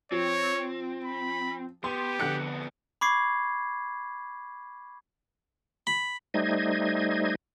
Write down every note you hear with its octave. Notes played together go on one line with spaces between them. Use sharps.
F3 C4 C#5
B5
B3 G4 C6
F2 D3 B3 F#6 C#7
B5 C#6 D6 G#6 C7
B5
G3 A3 D#4 C5 D#5 G#6